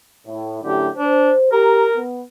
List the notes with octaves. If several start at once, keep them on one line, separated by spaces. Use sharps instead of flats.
A2
F#2 A2 D3 G4
D4 C5
G4 A#4 A#5
B3